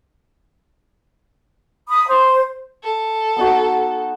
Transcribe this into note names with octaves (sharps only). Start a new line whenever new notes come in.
B5 D#6
C5
A4
B3 D#4 F#4